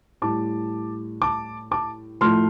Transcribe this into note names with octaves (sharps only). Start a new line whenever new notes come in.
A2 G3 A5 D6
A5 D6
A5 D6
A2 F3 A3 C6 F6